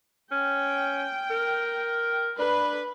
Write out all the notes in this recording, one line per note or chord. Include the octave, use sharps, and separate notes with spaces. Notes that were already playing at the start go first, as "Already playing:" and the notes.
C#4 G5
A#4
D4 B4